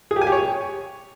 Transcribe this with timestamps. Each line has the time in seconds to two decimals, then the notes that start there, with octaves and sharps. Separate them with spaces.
0.11 G#4
0.16 G4
0.21 G#5
0.27 G4
0.32 C#5